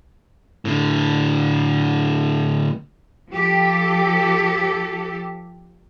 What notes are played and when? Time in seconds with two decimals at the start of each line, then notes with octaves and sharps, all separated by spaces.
0.65 A2 D3
3.31 F3 G4 A4